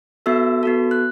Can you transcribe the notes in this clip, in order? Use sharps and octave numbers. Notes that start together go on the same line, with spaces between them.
B3 F#4 A4 E5 E6
B3 F#4 A4
F#6